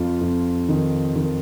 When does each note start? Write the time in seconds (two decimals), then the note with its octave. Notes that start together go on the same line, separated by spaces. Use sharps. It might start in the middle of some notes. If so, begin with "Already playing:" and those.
Already playing: F2 F4
0.21 F2
0.69 D#3
1.15 D#3